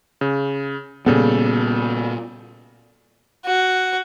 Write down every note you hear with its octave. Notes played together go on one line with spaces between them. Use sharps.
C#3
A#2 C#3 G3 B3 A4
F#4